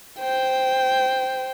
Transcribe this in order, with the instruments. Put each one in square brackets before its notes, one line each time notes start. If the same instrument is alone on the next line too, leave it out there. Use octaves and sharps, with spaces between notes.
[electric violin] C5 G5